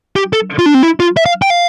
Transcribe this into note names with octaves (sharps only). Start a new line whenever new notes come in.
G4
A4
F4
D4
C4
E4
F4
E5
F5
G5
F5